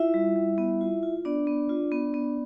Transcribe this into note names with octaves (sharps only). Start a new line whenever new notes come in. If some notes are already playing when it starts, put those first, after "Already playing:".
Already playing: E4 F4 E5
G3
G3
B3
F4
F4
B3 D4 D5
B3
F4
B3
B3